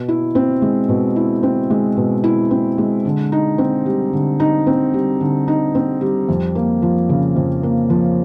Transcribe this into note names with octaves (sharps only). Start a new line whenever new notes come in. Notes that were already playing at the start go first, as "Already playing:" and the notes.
Already playing: B2
E4
C4
G#3
B2
E4
C4
G#3
B2
E4
C4
G#3
D3
D#4
C4
G3
D3
D#4
C4
G3
D3
D#4
C4
G3
F2
A#3
F3
C#3
F2
A#3
F3